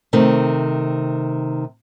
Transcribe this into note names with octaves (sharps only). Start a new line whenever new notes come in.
C3 D#3 A3